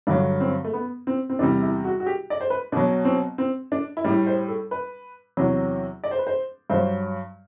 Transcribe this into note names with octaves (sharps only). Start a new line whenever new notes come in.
G2 D3 F#3 D4
C4
A3
B3
C4
C4
E2 C3 G3 D4
E4
F#4
F#4
G4
D5
C5
B4
B2 F#3 D4
C4
C4
D4
E4
A2 G3 D4
C5
A4
B4
E2 C3 F#3
D5
C5
B4
C5
G2 F#3 C5